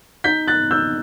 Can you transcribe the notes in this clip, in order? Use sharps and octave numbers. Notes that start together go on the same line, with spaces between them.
D#4 G6 B6
F#6 A6
D#4 E6 G6